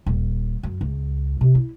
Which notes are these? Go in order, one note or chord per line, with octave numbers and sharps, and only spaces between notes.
D#1
F#2
C#2
C3
E4